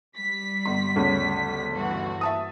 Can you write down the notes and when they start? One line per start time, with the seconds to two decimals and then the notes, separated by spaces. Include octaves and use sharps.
0.16 G3 B6
0.65 G1 C6
0.96 G1 D2 C#3
1.73 G2 E3 F#4
2.21 E5 A5 D#6